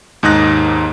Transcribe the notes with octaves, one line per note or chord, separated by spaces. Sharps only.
D#2 G#2 D#4 D#6 F#6 A#6